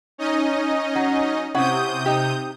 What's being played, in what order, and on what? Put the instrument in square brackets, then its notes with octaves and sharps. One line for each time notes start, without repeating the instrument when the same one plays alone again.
[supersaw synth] C#4 D#4 D#5
[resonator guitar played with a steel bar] F#3 F#5
[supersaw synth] C3 D#6 G6 [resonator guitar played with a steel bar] C#4 E4 F#5
[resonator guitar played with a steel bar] D#4 G4